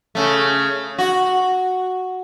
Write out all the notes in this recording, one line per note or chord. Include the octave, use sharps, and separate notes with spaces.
C#3 A3
F#4